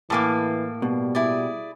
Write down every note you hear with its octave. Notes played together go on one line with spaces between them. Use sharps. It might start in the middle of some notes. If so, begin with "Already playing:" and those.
A2 E3 A#3 A4 G#5 D6
B2 G3
E4 G#4 D5